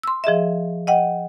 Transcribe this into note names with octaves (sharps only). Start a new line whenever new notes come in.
C6 E6
F3 G#4 D#5 E5
D#5 F#5 G5